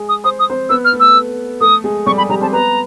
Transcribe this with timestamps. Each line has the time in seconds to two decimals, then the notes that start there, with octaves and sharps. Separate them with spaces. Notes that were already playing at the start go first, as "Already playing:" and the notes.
Already playing: G#3 G#4
0.09 D#6
0.24 C5 D#6
0.39 D#6
0.50 C4 C5
0.70 B3 B4 E6
0.85 F6
0.93 A3 A4
1.00 E6
1.61 A3 A4 D#6
1.84 G#3 G#4
2.06 G3 G4 C#6
2.18 G#3 G#4 B5
2.30 G3 G4 A#5
2.41 C4 C5 A5
2.53 B3 B4 A#5